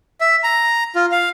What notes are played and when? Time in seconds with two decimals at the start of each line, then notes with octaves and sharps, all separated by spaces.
0.21 E5
0.44 A#5
0.95 F4
1.12 F5